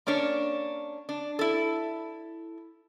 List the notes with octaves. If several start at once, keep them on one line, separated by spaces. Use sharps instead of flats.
A#3 C#4 D4 C#5
D4
E4 A4